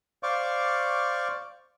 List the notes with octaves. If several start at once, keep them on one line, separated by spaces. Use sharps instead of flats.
C5 D5 F5 C#6 D6